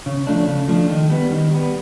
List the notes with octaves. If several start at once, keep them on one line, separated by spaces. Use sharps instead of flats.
C#3
F3 A3 D4
C#3
F3 A3 D4
D#3
G3 B3
D#3
G3 B3